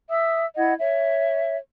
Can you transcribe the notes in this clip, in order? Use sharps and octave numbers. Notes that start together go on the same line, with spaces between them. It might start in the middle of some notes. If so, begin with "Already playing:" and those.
E5 D#6 E6
E4 D#5 F#5 G#6
C#5 E5